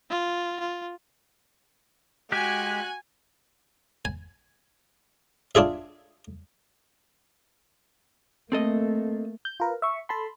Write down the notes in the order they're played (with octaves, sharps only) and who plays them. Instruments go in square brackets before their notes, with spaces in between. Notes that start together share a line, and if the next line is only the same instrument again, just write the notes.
[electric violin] F4
F4
[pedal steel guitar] G#3 G4 [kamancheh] F#4 F#6 [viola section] G#5
[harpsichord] G#5
D4 F4 G#4 E5
[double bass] A3 A#3 [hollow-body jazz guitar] C4 A4 D#5
[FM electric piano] G6
F4 A#4 B4
E5 C#6
A4 A5 B5 C6